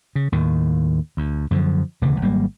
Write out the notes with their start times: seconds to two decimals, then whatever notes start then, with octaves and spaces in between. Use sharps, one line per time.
0.15 C#3
0.32 D#2 A2 D#3
1.17 D2
1.51 F#2 D3 D#3 F3
2.01 E1 D2 C#3 E3
2.22 G#1 F#3 G3 A#3